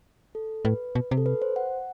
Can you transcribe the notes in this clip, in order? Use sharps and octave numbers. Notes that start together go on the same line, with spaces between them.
A4
A2 B4
B2
C3
A4
B4
C5
F#5